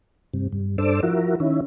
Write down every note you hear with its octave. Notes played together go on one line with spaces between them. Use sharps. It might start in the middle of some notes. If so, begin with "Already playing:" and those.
G2 C3
G2
G2 D4 A4 C5 D6 E6
F3 E4 F#4 A#4
D#3 C#4 E4